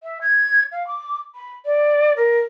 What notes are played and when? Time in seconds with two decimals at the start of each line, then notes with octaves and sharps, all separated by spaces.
0.03 E5
0.21 G#6
0.71 F5
0.87 D6
1.34 B5
1.65 D5
2.16 A#4